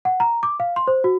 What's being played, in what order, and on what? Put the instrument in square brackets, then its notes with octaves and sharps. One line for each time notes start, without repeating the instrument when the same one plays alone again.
[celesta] F#5
A#5
D6
F5
C6
C5
F#4